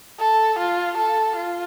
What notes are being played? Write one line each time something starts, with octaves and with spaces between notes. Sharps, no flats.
A4
F4
A4
F4